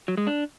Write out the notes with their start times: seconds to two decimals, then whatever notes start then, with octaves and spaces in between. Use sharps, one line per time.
0.08 F#3
0.17 G#3
0.27 D4